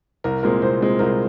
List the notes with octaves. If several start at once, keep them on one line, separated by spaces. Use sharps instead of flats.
C2 A#4
A#2 G#3 C4 A#4
C2 C5
A#2 G#3 C4
C2 A#4